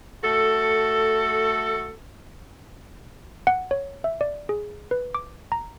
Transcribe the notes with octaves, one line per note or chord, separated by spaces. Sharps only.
A3 F#4 A4
F#5
C#5
E5
D5
G#4
B4
D6
A#5